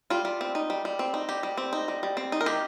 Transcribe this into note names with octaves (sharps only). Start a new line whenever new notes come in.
G3 F4
G3
C4
D#4
G3
G3
C4
D#4
G3 G4
G3
C4
D#4
G3
G3
C4
D#4
A#4
D#3 G4